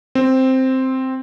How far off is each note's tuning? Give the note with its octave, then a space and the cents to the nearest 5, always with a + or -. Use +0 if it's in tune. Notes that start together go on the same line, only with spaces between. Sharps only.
C4 +0